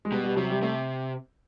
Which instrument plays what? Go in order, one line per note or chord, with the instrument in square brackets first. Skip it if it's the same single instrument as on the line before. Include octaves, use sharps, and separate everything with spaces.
[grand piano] G#3
[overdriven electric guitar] B2 [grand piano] G3
[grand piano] G3
[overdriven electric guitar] C3 [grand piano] F#3
[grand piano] G3
[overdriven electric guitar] C3 [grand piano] A3